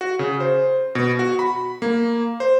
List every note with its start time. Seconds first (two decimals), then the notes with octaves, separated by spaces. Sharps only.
0.01 F#4
0.19 C#3
0.40 C5
0.95 B2
1.19 F#4
1.39 B5
1.82 A#3
2.40 C5